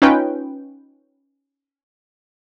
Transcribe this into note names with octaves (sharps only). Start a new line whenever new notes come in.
C#4 D#4 F4 B4 D#5 G5